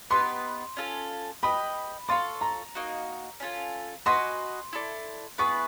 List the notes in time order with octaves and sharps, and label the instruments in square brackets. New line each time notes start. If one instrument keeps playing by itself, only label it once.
[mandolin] B3 D#4 G4 B4 [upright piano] C6
[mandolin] C#4 F4 A4
[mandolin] G4 B4 D#5 [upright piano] B5
[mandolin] D4 F4 A4 C#5 [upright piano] C6
[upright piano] A#5
[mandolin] A#3 D#4 F#4
C#4 F4 A4
[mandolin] F#4 B4 D#5 G#5 [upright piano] C6
[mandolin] E4 A4 D5
[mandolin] B3 E4 G#4 B4 [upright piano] C#6